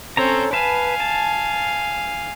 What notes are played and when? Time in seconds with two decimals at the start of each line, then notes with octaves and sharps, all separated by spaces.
0.17 C4 C#4 A4 C#5 A#5
0.53 B4 F5 G#5 A5
1.00 A5